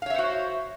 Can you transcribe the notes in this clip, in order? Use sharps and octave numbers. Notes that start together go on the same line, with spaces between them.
F#4 C5 C#5 E5 F5